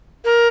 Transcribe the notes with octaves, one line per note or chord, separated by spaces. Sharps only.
A#4